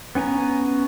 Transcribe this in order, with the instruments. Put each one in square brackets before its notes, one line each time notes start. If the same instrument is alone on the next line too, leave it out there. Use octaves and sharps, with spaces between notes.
[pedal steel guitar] B3 C#4 G#5 A#5